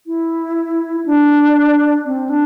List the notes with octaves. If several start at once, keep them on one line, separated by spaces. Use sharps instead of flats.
E4
D4
C4
D4